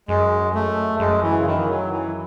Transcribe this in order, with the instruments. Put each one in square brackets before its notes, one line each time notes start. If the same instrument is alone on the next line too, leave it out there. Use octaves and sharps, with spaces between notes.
[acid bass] F#2 [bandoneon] G#3
[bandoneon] A3
[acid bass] F#2 [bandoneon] G#3
[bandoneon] E3
C#3
D#3
E3
F#3
E3